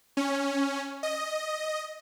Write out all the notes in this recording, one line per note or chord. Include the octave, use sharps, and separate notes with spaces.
C#4
D#5